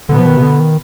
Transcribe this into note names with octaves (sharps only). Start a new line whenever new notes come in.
B2 D3 B3
F3
D#3
C3
D3
D#3